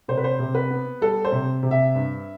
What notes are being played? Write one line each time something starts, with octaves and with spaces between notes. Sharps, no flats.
C3 C5
B4
C5
C3
B4
B3
G3 A4
C5
C3
C3
E5
G2